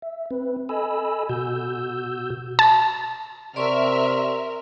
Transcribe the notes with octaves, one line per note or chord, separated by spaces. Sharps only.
E5
C4 B4
A4 D#5 G#5 B5 E6
B2 F#4 E6 G6
A5
C3 A#4 D5 E5 C6 C#6 F6